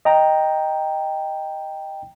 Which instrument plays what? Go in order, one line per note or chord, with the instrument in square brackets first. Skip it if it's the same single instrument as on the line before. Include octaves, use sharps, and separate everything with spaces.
[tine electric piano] D#5 G5 A#5